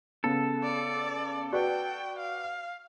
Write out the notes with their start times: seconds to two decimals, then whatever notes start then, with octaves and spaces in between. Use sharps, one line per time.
0.24 C#3 B3 A4
0.63 D5
1.53 F#4 B4 D5 G5
2.19 F5